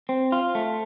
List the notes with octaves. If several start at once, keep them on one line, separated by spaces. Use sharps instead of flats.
C4
F4
A3